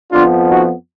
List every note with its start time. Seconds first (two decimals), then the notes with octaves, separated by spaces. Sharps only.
0.12 F2 F3 B3 D4 F4
0.49 D#4 F#4